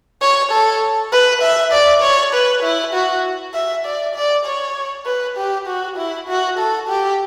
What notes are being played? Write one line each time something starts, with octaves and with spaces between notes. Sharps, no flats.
C#5
A4
B4
E5
D5
C#5
B4
E4
F#4
E5
D5
D5
C#5
B4
G4
F#4
E4
F#4
A4
G4